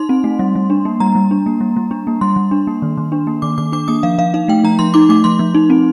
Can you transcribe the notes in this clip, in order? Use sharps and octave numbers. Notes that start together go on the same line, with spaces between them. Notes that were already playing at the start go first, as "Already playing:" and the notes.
Already playing: D#4 C6
C4
A3
G3
G3
D4
A#3
G3 A#5
G3
D4
A#3
G3
G3
D4
A#3
G3 C6
G3
D4
A#3
D#3
D#3
D4
A#3
D#3 D6
D#3 D6
D4 D6
A#3 D#6
F3 F5
F3 F5
D#4 F5
A3 G5
F3 A#5
F3 C6
D#4 D6
A3 D6
F3 C6
F3
D#4
C4